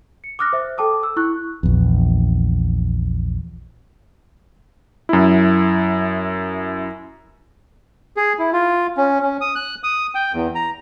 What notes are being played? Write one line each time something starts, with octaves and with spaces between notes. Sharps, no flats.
C#7
D6 D#6 F6 F#6 A#6
C5 E5
A4 G5 A5 D6 D#6
E6
E4 C#6 F#6
A#1 E2
F#2 E4
G#4
E4
F4
C#4
C#4
D#6
F#6
D#6
G5
E2
A#5